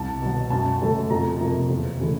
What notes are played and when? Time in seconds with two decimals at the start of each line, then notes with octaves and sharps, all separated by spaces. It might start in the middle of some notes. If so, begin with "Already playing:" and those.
Already playing: C2 A5
0.21 B2 F#3
0.50 F#2 A5
0.80 C#3 F#3 A3
1.10 F2 A#5
1.40 C3 F3 A#3
1.70 E2
2.00 C#3 E3 A3